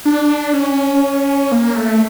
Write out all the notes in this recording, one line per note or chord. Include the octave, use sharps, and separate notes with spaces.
D4
C#4
A#3
A3